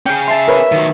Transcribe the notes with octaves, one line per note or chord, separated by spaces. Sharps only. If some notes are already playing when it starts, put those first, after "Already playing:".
C#4 G#4 G5
E5 A5 C6
A#4 B4 C#5
D#3 F#3